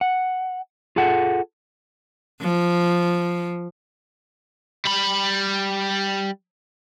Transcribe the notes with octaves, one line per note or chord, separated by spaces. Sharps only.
F#5
F4 G#4 A4 F#5
F3
G3 B5